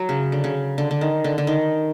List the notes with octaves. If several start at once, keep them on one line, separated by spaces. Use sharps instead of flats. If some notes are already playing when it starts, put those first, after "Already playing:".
Already playing: F#3
C#3
D3
C#3
D3
D3
D#3
D3
D3
D#3